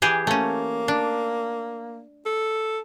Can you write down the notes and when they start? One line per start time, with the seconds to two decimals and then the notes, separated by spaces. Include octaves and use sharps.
0.02 E3 G4 G#4
0.27 A3 A#3 C#4
0.88 D4
2.26 A4